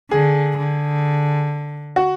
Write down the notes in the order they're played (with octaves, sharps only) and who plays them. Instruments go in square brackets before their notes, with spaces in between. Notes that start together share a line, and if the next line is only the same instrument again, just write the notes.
[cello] D3 [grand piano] G#4
[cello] D3
[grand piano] F#4